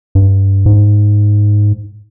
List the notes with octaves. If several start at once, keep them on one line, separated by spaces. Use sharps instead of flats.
G2
G#2